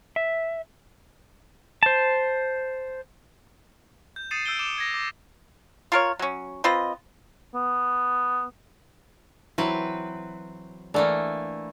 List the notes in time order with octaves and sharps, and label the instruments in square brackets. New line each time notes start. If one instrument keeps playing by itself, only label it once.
[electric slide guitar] E5
[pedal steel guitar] C5 A5
[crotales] G6
D#6 A6 C7 C#7 D#7 E7
E6 G6 D7 G7
D6 E7
G#6 A#6
D6
[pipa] F4 A#4 C#5
F#3 C#4
C4 F4 B4 D#5
[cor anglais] B3
[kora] E3 [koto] F#3 C4 B4
[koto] E3 A3 A#3 [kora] D4 A4 F#5